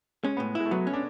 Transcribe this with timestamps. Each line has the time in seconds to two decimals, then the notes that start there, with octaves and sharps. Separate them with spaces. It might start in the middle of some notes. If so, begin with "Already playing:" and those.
0.24 G#3 C#4
0.37 B3
0.40 A2
0.55 G#3 E4
0.66 A3
0.71 F#3 B3
0.87 C#4
0.93 D4